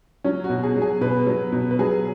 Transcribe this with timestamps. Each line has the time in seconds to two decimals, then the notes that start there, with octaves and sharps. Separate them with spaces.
0.24 F#3 C#4
0.44 F#4
0.50 B2
0.63 G#4
0.76 F#3
0.82 G#4
1.01 B2 B4
1.27 F#3
1.52 B2
1.71 B4
1.79 F#3 G#4